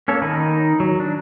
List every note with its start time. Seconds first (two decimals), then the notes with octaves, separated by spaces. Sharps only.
0.08 A#3 C#4 A4 C#5
0.22 D#3 D#4 B5
0.80 F#3
1.00 D4